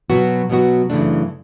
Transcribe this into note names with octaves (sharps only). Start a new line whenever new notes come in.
B2 F#3 B3 F#4
B2 F#3 B3 F#4
F#2 C#3 E3 A3 D4